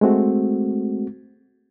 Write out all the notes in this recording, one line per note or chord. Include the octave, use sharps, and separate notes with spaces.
G#3 A3 C4 F#4